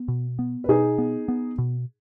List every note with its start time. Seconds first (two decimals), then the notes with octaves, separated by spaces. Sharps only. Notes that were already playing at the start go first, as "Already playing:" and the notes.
Already playing: B3
0.08 B2
0.39 B3
0.64 B4
0.68 B2 D#4 G#4
0.98 B3
1.28 B3
1.58 B2